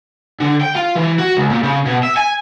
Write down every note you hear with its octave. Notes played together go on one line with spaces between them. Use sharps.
D3
G5
F4
E3
F#4
C#2
A#2
C#3
B2
E5
G#5